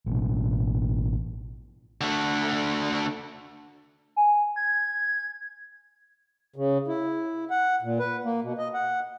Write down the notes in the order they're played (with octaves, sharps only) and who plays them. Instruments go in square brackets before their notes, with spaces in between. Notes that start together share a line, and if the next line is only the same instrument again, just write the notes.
[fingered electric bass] A1 B2
[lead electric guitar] D3 A3
[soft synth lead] G#5
G#6
[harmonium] C#3
E4
F#5
A#2
B4
A#3
B2
D#5
F#5